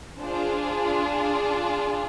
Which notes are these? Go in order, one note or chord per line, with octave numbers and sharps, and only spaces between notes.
D4 F4 G#4 C5